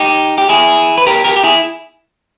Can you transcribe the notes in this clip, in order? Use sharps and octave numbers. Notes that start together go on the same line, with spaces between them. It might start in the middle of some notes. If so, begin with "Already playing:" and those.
Already playing: D#4 G4
G4
E4 G#4
B4
G4 A#4
G4 A#4
G4
E4 G#4